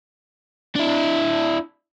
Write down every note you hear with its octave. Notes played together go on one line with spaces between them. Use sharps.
D4 E4